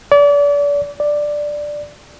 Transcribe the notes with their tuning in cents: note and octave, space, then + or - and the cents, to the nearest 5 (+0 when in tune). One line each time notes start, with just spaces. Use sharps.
D5 -35
D5 +5